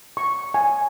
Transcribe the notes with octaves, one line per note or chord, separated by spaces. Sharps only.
C#6
G#5